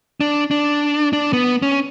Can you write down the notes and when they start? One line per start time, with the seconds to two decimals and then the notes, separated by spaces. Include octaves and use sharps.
0.21 D4
0.51 D4
1.13 D4
1.33 B3
1.62 C#4